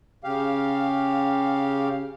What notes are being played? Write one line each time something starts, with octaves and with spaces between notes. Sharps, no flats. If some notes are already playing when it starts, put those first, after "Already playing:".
C#3 G4 F5